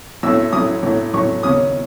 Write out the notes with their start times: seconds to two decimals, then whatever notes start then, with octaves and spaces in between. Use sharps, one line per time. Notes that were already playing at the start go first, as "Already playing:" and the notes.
0.23 B1 A2 F#3 A3 E6
0.53 B1 A2 F#3 A3 D#6
0.83 B1 A2 F#3 A3
1.13 B1 A2 F#3 A3 C#6
1.43 D#2 C#3 F#3 C#4 D#6